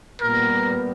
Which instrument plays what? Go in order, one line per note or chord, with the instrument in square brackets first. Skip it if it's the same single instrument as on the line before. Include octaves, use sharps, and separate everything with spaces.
[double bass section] A#2 G3 B3 [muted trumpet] A#4